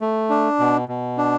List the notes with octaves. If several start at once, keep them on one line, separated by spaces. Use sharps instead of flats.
A3
D4
B2
B2
D4